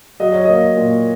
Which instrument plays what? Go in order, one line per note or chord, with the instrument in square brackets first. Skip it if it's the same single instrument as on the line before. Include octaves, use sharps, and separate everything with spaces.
[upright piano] F#3 D#5
C#5
A#3 D#5
A#2